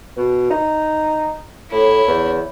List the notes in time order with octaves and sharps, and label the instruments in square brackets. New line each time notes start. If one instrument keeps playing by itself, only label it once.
[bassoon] B2
D#4
[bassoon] A2 [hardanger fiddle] E4 C#5
[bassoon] E2